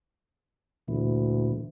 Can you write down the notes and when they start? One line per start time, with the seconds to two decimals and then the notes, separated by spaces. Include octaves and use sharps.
0.88 D2 A#2 E3